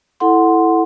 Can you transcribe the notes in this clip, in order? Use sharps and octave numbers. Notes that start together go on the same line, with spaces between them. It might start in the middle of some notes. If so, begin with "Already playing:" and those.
E4 A4 F#5 C6